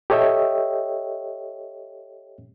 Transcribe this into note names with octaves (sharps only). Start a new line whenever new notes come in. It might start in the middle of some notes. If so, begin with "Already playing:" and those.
G4 A4 C#5 D#5 E5 G5